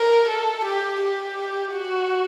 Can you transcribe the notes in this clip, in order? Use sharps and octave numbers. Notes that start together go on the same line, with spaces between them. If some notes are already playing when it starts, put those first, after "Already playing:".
Already playing: A#4
A4
G4
G4
F#4